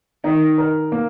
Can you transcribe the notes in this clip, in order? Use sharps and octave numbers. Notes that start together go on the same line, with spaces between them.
D#3 D#4
A#4
A#3